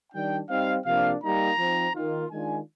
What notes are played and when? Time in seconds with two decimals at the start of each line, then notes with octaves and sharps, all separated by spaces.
0.13 D#3 G3 D4 G5
0.49 G3 C4 D#4 F5
0.86 C3 F3 A#3 D4 F5
1.22 G3 A#3 D#4 A#5
1.58 F3 C4 D#4
1.95 D#3 A#3 F4
2.31 D#3 G#3 D4 F4 G#5